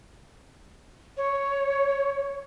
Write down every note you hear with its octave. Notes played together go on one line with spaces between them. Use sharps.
C#5